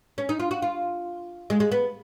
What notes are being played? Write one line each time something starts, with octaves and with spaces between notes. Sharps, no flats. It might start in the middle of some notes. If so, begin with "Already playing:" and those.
C#4
D#4
F4
F#4
F4
G#3
G#3
B3